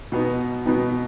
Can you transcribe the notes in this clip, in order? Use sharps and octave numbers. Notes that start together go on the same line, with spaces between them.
B2 B3 D#4
B2 B3 D#4